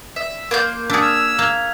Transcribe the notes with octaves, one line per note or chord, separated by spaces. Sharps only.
E5
A#3 C6 G6
D4 G#4 E6 B6
E6 F6 G#6 F7
A#3 F6 G#6 F7